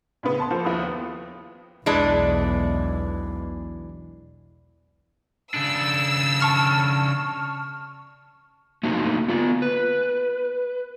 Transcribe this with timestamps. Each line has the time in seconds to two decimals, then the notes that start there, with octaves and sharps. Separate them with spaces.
0.23 A2 C#3 B3
0.38 B4 A5 C6
0.50 F3 A#3 A4 C5
0.65 D#2 F3 E4 B4 D#6
0.83 B3
1.86 B1 E2 E3 G#3 D4
5.54 C#3 D4 E6
6.40 A5 C#6 F6
8.83 A3 A#3 C4 D#4 F#4
9.28 B3 F4
9.62 B4